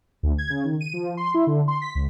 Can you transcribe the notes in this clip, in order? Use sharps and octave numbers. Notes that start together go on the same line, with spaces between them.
D2
G#6
C#3
D#3
D#7
F3
C6
E4
D3
C6
B6
C#2